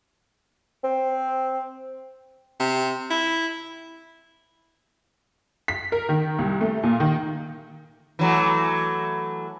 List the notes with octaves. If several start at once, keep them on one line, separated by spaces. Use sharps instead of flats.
C4
C3
E4
B6
A#4
D#3
C2
A3
A#2
D#3
E3 F#3 A3